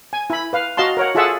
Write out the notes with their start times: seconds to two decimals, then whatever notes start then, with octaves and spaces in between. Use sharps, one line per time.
0.13 G#5
0.30 E4 B5
0.53 B4 F5
0.77 F#4 D#5 F5 A5 C6
0.97 A#4 C#5 F#5
1.15 F4 G#4 A4 E5 F#5 A5